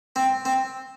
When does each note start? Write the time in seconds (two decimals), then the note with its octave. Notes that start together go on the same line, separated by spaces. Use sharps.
0.16 C4
0.45 C4